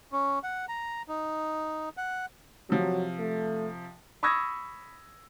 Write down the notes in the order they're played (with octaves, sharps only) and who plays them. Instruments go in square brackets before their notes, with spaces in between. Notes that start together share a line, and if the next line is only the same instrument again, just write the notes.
[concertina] C#4
F#5
A#5
D#4
F#5
[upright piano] C3 F3 [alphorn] F#3
[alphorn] A3
[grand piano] B5 C#6 D#6 E6 G#6 A#6